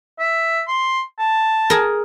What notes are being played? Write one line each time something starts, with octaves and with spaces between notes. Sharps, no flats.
E5
C6
A5
G#4 A#4